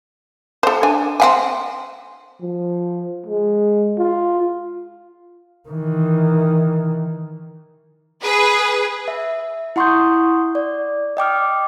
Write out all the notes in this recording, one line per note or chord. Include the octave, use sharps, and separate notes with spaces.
A4 C5
D4 G#5
C4 F#5 G#5
F3
G#3
F4
D#3 E3
G#4 B4
E5
E4 F#5 C6 C#6 D#6 G6
D5
D#5 G5 D6 F6